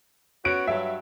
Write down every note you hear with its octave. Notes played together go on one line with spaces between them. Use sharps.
B3 C#4 F#4 D7
G2 F#3 E5